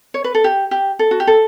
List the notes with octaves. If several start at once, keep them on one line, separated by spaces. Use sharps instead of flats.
C#5
B4
A4
G4
G4
A4
F#4
G4
A4